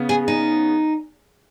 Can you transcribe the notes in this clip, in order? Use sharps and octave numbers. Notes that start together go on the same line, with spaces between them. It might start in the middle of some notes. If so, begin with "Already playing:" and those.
Already playing: C#3 B3
G#4
D#4